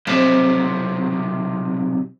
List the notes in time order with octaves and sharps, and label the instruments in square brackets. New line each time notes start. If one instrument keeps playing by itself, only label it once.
[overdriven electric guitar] B1 C3 [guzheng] F3